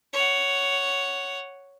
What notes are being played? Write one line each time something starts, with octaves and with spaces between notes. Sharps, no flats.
C#5 F#5